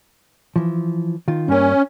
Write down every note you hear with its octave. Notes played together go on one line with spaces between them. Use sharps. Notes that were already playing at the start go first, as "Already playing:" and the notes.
E3 F3
D#3 F4
G2 A#3 C#4